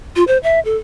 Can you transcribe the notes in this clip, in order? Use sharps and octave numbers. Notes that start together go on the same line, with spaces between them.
F4
C5
E5
A4